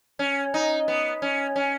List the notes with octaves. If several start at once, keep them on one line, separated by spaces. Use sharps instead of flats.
C#4
D#4
B3
C#4
C#4